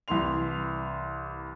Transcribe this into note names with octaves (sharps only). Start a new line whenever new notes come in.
C2 E3 E4 C6 F7